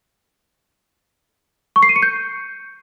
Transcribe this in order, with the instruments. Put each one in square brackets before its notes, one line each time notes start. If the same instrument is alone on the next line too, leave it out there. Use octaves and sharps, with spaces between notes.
[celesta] C#6
C7
D#7
C#7
G6